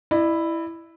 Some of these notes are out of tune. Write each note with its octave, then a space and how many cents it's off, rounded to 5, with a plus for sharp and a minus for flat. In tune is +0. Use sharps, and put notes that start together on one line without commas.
E4 +0 D5 +45